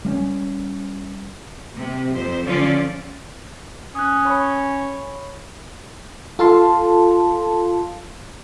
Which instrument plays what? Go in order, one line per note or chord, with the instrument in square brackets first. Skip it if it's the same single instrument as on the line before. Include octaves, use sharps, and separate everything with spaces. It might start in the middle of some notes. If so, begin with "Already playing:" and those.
[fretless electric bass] G3 A#3 C#4
[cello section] C3
F2 C5
D3 F3 C#4 F4 D5
[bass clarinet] C#4 [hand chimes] D#6 F#6
[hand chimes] C#5 B5 C#6
[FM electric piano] F4 A4 F5 A5 C6